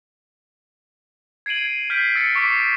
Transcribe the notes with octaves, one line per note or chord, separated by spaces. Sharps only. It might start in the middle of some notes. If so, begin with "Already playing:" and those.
G#6 C7 D7 D#7 F#7
F6 G6 B6 C7 D7
E6 A6 C#7
C#6 D6 E6 B6 C7 D7